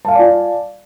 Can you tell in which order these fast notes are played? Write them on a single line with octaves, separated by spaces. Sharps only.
A5 F5 G#5 D5 F4